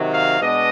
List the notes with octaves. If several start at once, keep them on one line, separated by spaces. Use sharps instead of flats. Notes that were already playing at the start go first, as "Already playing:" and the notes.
Already playing: C3 D#3 F#3
F5
B2 G#3 B3 D4 D#5